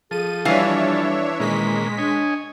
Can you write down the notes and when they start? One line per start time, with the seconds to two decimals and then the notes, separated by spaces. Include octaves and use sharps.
0.11 F3 G#4 A4 D#7
0.45 E3 G3 D4 C#5 E5 F5 G#5
1.40 A#2 D#3 G#3 A#3 C#4 B6
1.98 D4 C#5 D#5 G#5